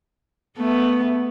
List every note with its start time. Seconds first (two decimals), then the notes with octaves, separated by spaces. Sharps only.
0.57 A3 B3